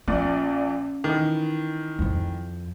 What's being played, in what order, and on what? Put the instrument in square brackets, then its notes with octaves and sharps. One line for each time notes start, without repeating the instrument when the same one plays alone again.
[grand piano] A#1 A#2 D5 [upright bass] C#4
[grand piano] D#3 E3
[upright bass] F2 F3